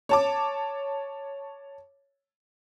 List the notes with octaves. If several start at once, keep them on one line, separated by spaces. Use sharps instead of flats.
C#5 A5 D6